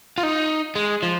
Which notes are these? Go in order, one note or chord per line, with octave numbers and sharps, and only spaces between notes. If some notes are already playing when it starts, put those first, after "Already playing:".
F4
D#4
G#3
F3